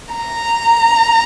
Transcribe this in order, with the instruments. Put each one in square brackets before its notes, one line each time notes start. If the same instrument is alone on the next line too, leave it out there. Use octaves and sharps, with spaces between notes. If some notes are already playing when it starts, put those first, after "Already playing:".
[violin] A#5